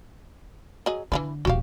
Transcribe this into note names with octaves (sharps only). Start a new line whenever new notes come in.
F#3 G#4 D#5
D3 E3 A3 B4
D#1 E2 F#4 G4 F5